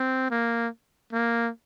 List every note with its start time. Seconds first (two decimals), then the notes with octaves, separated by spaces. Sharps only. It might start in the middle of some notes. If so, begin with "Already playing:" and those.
Already playing: C4
0.31 A#3
1.13 A#3